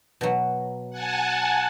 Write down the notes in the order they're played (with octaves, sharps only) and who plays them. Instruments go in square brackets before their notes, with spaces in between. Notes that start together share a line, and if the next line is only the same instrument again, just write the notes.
[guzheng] B2 F#3
[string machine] F#5 G#5 A5